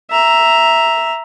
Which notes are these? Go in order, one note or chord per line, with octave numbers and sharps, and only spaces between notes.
E5 A#5